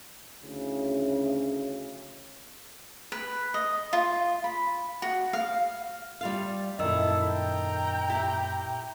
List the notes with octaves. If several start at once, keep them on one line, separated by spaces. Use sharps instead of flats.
D2 A2 C#3
B4
D#5
F4
B5
F#4
F5
G3 F4 F5
F#2 A#2 D#3 E4 A4 D#5 E6
G5 A#5
E4 G4